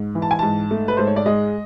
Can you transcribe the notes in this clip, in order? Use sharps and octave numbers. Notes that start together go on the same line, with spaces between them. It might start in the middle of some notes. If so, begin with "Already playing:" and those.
Already playing: G#2
E3
A5
G#5
G#2 A5
A3
B4
G#2 C5
C#5
D5
G#3 D#5